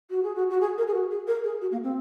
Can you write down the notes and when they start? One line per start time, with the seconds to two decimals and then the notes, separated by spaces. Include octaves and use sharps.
0.10 F#4
0.23 G#4
0.35 F#4
0.50 F#4
0.60 G#4
0.78 A#4
0.88 G#4
0.94 F#4
1.11 G#4
1.27 A#4
1.44 G#4
1.61 F#4
1.72 A#3
1.83 C4